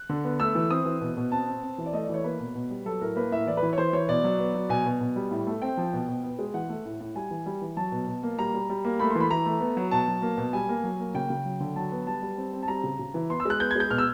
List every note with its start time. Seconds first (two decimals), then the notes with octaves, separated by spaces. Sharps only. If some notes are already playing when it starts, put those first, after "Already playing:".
Already playing: F#6
0.09 D3
0.24 B3
0.40 A3 E6
0.55 E3
0.70 C4 D#6
0.85 E3
1.01 B2
1.17 B2
1.32 C4 A5
1.47 C4
1.63 C4
1.78 E3
1.86 D5
1.93 A3 D#5
2.04 D5
2.09 E3
2.14 C#5
2.24 A#3 B4
2.40 B2
2.55 B2
2.70 G3
2.85 F#3 A4
3.01 A2 A#4
3.16 A#3 B4
3.32 A2 E5
3.47 E3 D5
3.57 B4
3.63 E3
3.73 C#5
3.78 E3 C5
3.93 E3 C#5
4.08 B2 D5
4.24 F#3
4.39 B3
4.54 F#3
4.69 B2 G#5
4.86 B2
5.01 B2
5.16 G3
5.31 A2
5.47 A3
5.62 C4 G5
5.77 F3
5.93 B2
6.08 B2
6.23 B3
6.39 G#3
6.54 E3 F#5
6.69 A3
6.85 A2
7.00 A2
7.15 G3 G#5
7.30 E3
7.46 G3
7.62 E3
7.77 F#3 A5
7.92 B2
8.07 B2
8.23 A#3
8.38 G3 A#5
8.54 G3
8.70 G3
8.85 A#3
8.99 A3 B5
9.10 E3 C6
9.20 B5
9.30 E3 A#5
9.46 A3
9.61 B3
9.77 F#3
9.91 B2 A5
10.08 F#3
10.22 A#3
10.37 B2
10.53 G3 G#5
10.69 A#3
10.84 F#3
11.00 A#3
11.15 C#3 G5
11.30 C#3
11.45 F#3
11.60 D3
11.76 F#3 A5
11.92 B3
12.07 G3 A5
12.22 G3
12.38 C4
12.53 C4
12.63 A5
12.68 G3 A#5
12.84 C#3
12.99 C#3
13.14 E3
13.30 B3 C6
13.40 E6
13.45 G#3 F#6
13.60 B3 G6
13.71 G#6
13.76 G#3 G6
13.90 B2 F6
13.98 E6